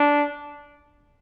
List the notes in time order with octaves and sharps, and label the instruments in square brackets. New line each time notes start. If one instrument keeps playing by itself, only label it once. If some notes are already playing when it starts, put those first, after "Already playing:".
Already playing: [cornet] D4